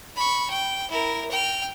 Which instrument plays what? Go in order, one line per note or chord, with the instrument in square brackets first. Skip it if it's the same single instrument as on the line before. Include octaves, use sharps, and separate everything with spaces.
[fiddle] B5 C#6
G5
E4 A#4
G5 F6